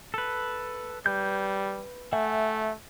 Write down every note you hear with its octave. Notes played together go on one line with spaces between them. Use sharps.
A4 B4
G3 B4 G6
A3 E5 F#5 G#5